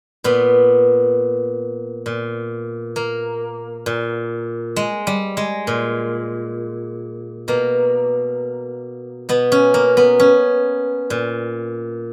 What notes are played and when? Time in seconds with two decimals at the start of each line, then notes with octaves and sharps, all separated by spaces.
0.24 A#2 B3
2.06 A#2
2.96 A#3
3.86 A#2
4.76 G#3
5.07 G3
5.37 G#3
5.67 A#2
7.48 B2 A#3
9.29 B2 B3
9.52 C#4
9.74 A#3
9.97 B3
10.20 C#4
11.10 A#2